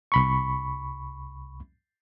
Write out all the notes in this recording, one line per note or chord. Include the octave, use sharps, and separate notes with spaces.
C2 B5 C#6